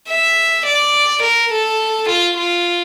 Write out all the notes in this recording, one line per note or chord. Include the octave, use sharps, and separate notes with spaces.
E5
D5
A#4
A4
F4
F4